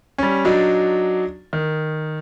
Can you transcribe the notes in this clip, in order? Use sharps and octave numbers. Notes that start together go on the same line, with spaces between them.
G3 C#4
F#3 D4 D#4 D5
D#3